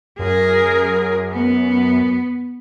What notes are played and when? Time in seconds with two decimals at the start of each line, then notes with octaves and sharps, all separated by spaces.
0.19 F#2 G#4 A#4
1.32 B3